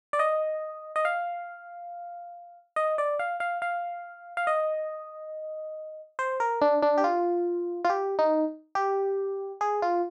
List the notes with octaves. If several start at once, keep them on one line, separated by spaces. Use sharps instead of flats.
D5
D#5
D#5
F5
D#5
D5
F5
F5
F5
F5
D#5
C5
A#4
D4
D4
G4
F4
F4
G4
D#4
G4
G#4
F4